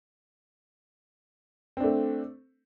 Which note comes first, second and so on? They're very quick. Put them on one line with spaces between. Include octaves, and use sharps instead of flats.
C4 D4 A3